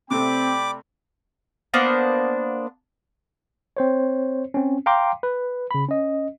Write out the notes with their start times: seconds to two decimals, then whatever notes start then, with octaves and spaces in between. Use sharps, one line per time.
0.11 C3 A3 C4 D5 G5 B5 D6
1.74 A#3 B3 D4 C5
3.77 C4 C5 C#5
4.54 C4 C#4
4.86 F5 G5 A#5 C6 D6
5.23 B4
5.71 C#3 B5
5.89 C#4 D#5